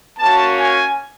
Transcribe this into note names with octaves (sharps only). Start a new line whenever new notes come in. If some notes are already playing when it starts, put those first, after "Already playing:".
A#3 C#4 F#4 A5
G#5